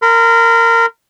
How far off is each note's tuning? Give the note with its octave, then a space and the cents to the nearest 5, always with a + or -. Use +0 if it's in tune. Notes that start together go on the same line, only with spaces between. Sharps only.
A#4 -15 B5 +40